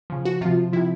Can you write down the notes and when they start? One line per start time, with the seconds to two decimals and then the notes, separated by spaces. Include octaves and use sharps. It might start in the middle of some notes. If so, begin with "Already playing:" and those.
0.10 C#3 F3
0.25 F#4
0.41 C3 F3 F4
0.73 C3 F3 E4